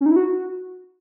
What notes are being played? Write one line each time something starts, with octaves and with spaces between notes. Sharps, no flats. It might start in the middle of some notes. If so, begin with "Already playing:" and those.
C#4
D#4
E4
F#4